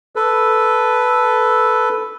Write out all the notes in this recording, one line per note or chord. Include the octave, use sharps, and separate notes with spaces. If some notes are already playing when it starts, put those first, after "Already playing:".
A4 B4